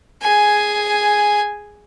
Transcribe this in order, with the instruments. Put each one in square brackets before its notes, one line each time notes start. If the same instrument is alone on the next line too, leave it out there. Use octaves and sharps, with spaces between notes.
[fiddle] G#4 G#5